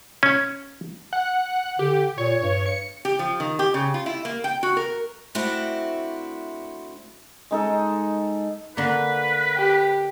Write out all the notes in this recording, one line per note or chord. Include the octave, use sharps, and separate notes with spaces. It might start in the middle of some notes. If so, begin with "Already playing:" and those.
C#4
F#5
D3 G4
A#2 C#5
G2
C#7
G4
F3
D#3
G4
C#3
F4
E4
A#3
G5
F#4
A#4
A3 C4 D4 E4 F#4
G#3 D#4 A4
D3 A#3 B4
G4